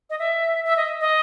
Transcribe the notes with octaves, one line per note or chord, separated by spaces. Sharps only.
D#5
E5
E5
D#5
D#5